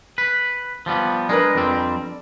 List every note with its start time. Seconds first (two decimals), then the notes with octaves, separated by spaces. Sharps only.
0.18 B4
0.86 F3 G3 B3
1.29 G#3 D4 A#4 B4
1.55 F2 G3 C4